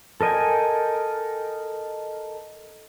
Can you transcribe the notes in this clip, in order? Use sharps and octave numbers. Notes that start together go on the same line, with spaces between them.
A4 A#4 D#5 G5 G#5